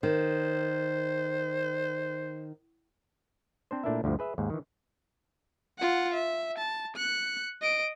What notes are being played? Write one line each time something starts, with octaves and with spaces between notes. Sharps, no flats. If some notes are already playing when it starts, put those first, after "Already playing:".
D#3 C5
C4 D4 C5
A#2 A3 D4 E4 A#4 E5
D2 G2 D3 F3
G#4 B4 E5
D#2 G#2
D#3 E3
F4 F#5
E5
A5
F#6 C#7
D#5 D7